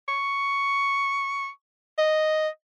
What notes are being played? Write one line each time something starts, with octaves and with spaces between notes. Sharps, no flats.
C#6
D#5